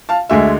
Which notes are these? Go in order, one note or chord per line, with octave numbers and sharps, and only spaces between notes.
F5 A5
D2 D3 G#3 E5 G#5